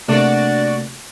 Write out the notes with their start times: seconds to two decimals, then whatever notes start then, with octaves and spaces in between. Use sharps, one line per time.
0.08 C3 A3 A#3 D4 F#4 D5